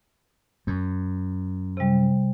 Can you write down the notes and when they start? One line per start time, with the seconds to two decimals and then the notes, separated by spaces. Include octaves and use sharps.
0.67 F#2
1.77 C3 G3